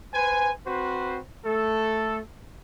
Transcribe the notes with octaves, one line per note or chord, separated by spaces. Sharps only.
B4 C5 G#5
C4 F#4 B4 C5
A3 A4